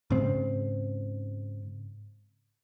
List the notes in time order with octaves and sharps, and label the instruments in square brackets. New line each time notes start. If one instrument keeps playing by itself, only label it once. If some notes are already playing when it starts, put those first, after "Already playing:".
[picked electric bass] G#2 C#3 C4